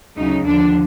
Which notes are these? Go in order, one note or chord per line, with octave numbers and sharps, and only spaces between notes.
D2 C#3 F#3 D#4
D#2 D3 F3 D4